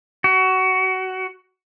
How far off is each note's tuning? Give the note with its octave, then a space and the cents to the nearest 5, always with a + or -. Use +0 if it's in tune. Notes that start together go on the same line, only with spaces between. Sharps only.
F#4 +20